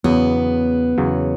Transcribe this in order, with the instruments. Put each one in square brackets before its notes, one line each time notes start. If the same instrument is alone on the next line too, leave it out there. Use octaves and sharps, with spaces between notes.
[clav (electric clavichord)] E2 C#3 F#3 [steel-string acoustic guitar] B3
[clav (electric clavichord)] E2 C#3 F#3